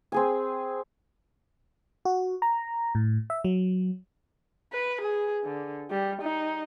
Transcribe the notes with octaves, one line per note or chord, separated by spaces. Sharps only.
C4 G#4 G#5
F#4
A#5
A2
E5
F#3
B4
G#4
D3
G3
D#4